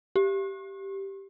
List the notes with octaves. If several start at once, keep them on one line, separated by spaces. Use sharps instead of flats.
G4